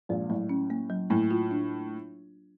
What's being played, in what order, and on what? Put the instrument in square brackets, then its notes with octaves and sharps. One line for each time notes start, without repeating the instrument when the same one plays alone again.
[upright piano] A#1 A#2 [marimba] G#3
[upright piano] A2 [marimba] F#3
[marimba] C#4
A#3
F#3
[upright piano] A2 [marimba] A#3
[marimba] F4
D4